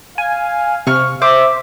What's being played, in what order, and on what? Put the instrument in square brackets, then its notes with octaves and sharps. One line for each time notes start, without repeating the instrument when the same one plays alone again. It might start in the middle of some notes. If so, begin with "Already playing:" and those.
[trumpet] F5 [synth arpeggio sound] G#5
[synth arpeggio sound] C3 [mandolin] C#6 F6
[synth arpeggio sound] C5 [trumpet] E5 [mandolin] D6